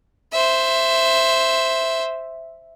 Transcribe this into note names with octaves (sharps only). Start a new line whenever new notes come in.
C5 E5